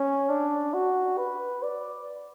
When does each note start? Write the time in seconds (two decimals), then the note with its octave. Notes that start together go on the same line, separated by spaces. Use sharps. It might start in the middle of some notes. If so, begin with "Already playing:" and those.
Already playing: C#4
0.29 D4
0.74 F#4
1.18 B4
1.63 D5